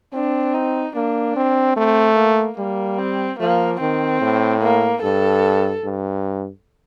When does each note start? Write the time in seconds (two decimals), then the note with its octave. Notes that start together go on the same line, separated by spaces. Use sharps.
0.13 C4 D4
0.54 D#4
0.95 A#3 D4
1.36 C4
1.76 A3 C4
2.17 A#3
2.58 G3 A#3
2.98 C4
3.39 F3 A#3
3.81 D#3 C4
4.21 A2
4.62 A#3
5.02 G2 A4
5.84 G2